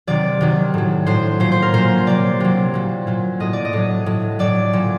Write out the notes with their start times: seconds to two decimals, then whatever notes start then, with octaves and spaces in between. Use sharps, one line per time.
0.07 C3 D#3 F#3 D5
0.41 C3 D#3 F#3
0.74 A2 F#3
1.06 A2 F#3 C5
1.40 A#2 F#3 C5
1.52 C5
1.62 A#4
1.74 A#2 F#3 C5
2.07 C3 F#3 D5
2.40 C3 F#3
2.74 A#2 F#3
3.07 A#2 F#3
3.40 A2 F#3 D#5
3.53 D5
3.65 D#5
3.73 A2 F#3
4.06 A2 F#3
4.39 A2 F#3 D5
4.73 A#2 F#3